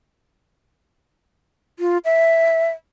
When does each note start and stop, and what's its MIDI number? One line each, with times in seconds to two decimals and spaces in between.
1.79 1.98 65
2.05 2.70 76